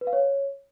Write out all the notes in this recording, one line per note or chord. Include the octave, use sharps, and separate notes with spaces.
B4
F5
C#5